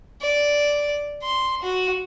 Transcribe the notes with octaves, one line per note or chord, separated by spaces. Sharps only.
D5
C6
F#4